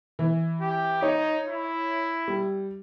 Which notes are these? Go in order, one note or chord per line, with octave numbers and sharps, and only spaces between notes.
E3
G4
D#4 C#5
E4
G3